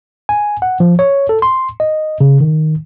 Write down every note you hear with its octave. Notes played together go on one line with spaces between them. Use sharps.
G#5
F#5
F3
C#5
A4
C6
D#5
C#3
D#3